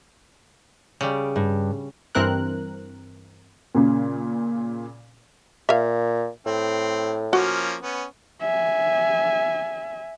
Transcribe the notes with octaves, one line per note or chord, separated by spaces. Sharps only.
C#3 G3
G2
G2 E3 C4 A#4 F#6
A#2 C#3
A#2 E5 F5
A2 C4
F3 A#3 C#4 F#4
B3 C#4
E5 G#5